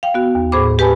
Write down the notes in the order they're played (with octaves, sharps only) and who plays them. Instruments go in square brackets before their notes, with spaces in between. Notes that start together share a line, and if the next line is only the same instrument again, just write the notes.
[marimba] F5 G5
B3 F#4
D#2
A2 G#4 C5 B5 D6
G4 B4 G#5 A5 B5